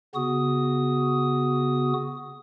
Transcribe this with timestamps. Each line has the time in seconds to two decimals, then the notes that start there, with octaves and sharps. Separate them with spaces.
0.15 C#3 B3 F#4 D#6